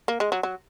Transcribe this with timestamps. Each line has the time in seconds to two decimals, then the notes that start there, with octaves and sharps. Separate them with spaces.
0.08 A#3
0.20 G#3
0.32 F#3
0.43 F#3